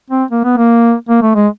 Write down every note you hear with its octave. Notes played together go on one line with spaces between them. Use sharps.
C4
A#3
B3
A#3
A#3
A3
G#3